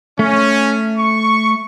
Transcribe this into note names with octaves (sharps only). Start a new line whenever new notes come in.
A3 C#4
C#6